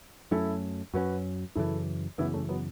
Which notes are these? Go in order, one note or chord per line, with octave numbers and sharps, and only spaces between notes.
F#2 F#3 A3 C#4 E4 A4
F#2 F#3 A3 C#4 F#4 B4
F#2 C#3 E3 E4 A4
F#2 C#3 E3 B3 E4
A3 C#4
F#3 B3